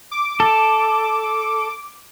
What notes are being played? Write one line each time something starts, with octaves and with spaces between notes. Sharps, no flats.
D6
A4